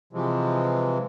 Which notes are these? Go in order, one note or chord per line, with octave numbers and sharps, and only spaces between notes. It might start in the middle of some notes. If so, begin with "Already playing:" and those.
C3 E3 F3 G#3